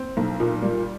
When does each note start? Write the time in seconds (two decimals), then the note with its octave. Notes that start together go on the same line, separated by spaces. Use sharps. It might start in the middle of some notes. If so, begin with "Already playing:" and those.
Already playing: C4
0.17 B1
0.40 A#2
0.62 G3